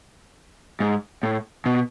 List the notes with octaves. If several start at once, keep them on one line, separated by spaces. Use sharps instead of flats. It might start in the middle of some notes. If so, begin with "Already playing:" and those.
G#2
A2
B2